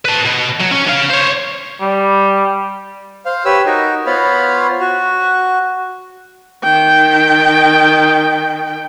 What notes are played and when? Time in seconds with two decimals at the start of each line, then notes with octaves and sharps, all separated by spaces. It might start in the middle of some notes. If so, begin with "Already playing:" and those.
0.05 B4 A5
0.25 B2
0.60 F#3
0.71 C#4
0.87 C#4 F5
1.10 C5 C#5
1.81 G3
3.26 C5 F5
3.45 G4 B4 C#5 E6
3.66 D#4 F#4 A#4
4.06 B3 F4 C5 C#5 F5 B5
4.80 F#4
6.64 D#3 G5